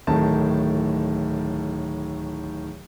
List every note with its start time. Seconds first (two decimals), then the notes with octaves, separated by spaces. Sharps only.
0.07 D1 A2 D#3 A5